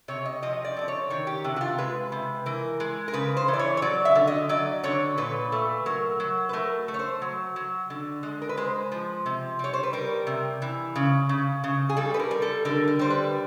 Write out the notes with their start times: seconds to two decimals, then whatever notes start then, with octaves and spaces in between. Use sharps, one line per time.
0.08 C3 C#5
0.25 D#5
0.43 F3 D#5
0.65 D5
0.77 C3 D5
0.88 C#5
1.10 D#3 C#5
1.27 G4
1.44 C3
1.56 F#4
1.61 F4
1.78 G#3 B4
2.12 C3
2.46 E3 A#4
2.80 G#3
3.08 A#4
3.13 C#3 B4
3.37 C5
3.48 E3
3.53 D5
3.59 C#5
3.77 C#5
3.82 F#3 D5
4.05 E5
4.15 D3
4.27 D#5
4.49 F#3 D5
4.84 D3 C#5
5.18 A#2 B4
5.52 A3
5.86 F#3 A#4
6.20 F#3
6.49 B4
6.53 A3 A#4
6.88 A3
6.94 C#5
6.99 C5
7.22 F#3
7.56 F#3
7.90 D3
8.23 G#3
8.42 A#4
8.49 B4
8.57 G#3 C5
8.92 F3
9.26 C3
9.59 G3 C#5
9.73 C5
9.83 B4
9.93 G3 A#4
10.27 C3
10.62 E3
10.96 C#3
11.29 C#3
11.64 C#3
11.89 G#4
11.97 G3 A4
12.14 B4
12.19 A#4
12.31 G3
12.42 A4
12.65 D3 A#4
12.87 A#4
12.99 G3 C5
13.10 B4